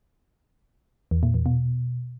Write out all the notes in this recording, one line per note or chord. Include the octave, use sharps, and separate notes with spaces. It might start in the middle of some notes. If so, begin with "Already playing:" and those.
E2
A#2
E2
B2